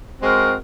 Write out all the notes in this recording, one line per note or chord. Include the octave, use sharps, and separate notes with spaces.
G#3 C4 F#4 A#4